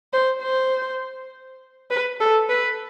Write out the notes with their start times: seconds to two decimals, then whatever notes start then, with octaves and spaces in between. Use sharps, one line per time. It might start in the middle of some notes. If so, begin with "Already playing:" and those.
0.13 C5
0.43 C5
1.91 B4
2.20 A4
2.50 B4